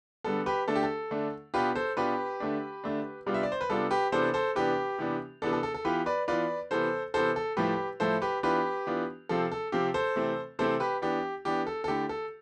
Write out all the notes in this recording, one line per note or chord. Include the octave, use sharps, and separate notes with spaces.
D3 G3 B3 A4
G4 B4
D3 A3 D4 A4
G4
A4
D3 A3 D4
B2 B3 D4 F4 G4 B4
A4 C5
B2 B3 D4 F4 G4 B4
D3 A3 D4
D3 A3 D4
C3 G3 B3 D4 F4
E5
D5
C5
B4
C3 G3 B3 D4 F4 A4
G4 B4
C3 E3 B3 D4 A4 C5
A4 C5
C3 E3 B3 D4 G4 B4
C3 E3 B3 D4
C3 E3 B3 D4 A4
A4
A4
A4
E3 B3 F4 G4 B4
B4 D5
E3 B3 F4 B4 D5
C3 E3 B3 A4 C5
C3 E3 B3 A4 C5
A4
A2 F3 A3 E4 G4 B4
A2 F3 A3 E4 A4 C5
G4 B4
E3 B3 D4 F4 G4 B4
E3 B3 D4 F4
C3 F3 C4 F4 A4
A4
C3 F3 C4 F4 G4
A4 C5
C3 E3 A3 C4
C3 E3 A3 C4 A4 C5
G4 B4
E3 B3 D4 G4
E3 B3 D4 G4
A4
A4
D3 A3 E4 G4
A4